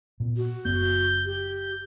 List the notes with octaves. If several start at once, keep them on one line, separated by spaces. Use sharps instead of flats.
A#2 B3
F#4
F#1 F#2 B3 G6
G4